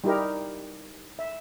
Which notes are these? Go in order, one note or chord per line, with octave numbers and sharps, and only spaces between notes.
G3 D#4 E4 G4 A#4
E5